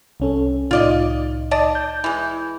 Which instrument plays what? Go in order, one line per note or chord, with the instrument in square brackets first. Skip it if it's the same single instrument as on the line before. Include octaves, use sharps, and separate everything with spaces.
[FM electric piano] C2 C#4 A4
[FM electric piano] C2 A2 D#4 [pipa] F4 D5 D#5
[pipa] D5 D#5 A5
[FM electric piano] G6
[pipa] E3 G#3